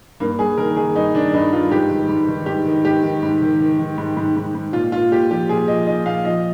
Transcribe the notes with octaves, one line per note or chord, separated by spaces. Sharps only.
G2 A#3
G2 G#4
D#3 A#4
D#3 G#4
G2 D#4
D#3 D4
G2 D#4
G2 F4
G#2 G4
D#3
G#2
D#3
G#2 G4
D#3
G#2 G4
D#3
G#2
D#3
D#3
D#3
G#2
G#2
G#2
G#2
A#2 F4
A#2 F4
A#2 G4
F3 G4
A#2 G#4
F3 D#5
A#2 D#5
A#2 F5
F3 D#5